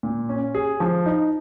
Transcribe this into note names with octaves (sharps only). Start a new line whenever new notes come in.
A#2
C#4
G#4
F3
D#4